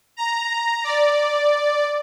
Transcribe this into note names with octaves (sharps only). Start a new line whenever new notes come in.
A#5
D5